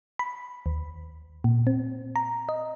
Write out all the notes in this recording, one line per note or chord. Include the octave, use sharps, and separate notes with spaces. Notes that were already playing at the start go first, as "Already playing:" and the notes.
B5
D#2
A#2
C4
A#5
D#5